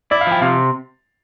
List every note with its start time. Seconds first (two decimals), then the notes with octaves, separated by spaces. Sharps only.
0.11 E4 D5
0.21 F5
0.27 F3 G5
0.42 C3 F5